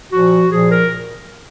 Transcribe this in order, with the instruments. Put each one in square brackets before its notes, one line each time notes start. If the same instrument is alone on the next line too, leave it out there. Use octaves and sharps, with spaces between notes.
[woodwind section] A#2 F3 F#4
A#2 F3 G#4
A#4